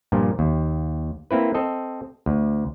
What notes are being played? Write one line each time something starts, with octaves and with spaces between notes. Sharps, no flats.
G2 A#2 F3
D#2
A#3 C4 E4 B4
C4 A4 D#5
D2